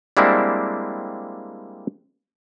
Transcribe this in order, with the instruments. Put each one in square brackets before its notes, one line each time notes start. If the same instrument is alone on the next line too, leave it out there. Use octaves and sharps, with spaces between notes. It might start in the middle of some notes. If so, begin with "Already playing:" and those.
[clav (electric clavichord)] G3 G#3 A#3 C4 D4 E4